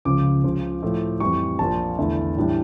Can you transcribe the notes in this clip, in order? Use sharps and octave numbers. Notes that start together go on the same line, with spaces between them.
C#2 C#3 F3 D6
C#2 C#3 F3
A2 F3 A3
F2 E3 G3 C#6
A#1 A#2 F3 A5
E2 D3 A3 E4
A2 E3 G3 D4